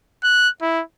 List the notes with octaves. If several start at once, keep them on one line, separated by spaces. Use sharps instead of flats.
F#6
E4